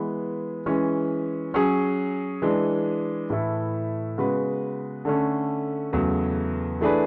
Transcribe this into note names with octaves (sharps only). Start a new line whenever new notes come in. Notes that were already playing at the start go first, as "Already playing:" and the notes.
Already playing: E3 G#3 B3
E3 G#3 C#4
F#3 C#4 G#4
E3 G#3 D4
A2 E3 A3 E4 A4
C#3 G#3 B3 F#4 B4
D3 A3 C#4
E2 C#3 F#3 A3
E3 A3 D4 G#4 B4